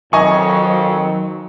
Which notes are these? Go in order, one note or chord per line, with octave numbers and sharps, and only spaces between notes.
F2 D#3 F#3 D#5 G#5 C#6